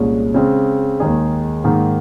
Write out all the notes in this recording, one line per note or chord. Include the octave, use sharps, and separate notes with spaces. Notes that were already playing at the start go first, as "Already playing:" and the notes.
Already playing: C2 A#2 G#3 C#4
C#3 G#3 C4
D#2 D#3 G#3 D#4 G#4
G#2 D#3 A#3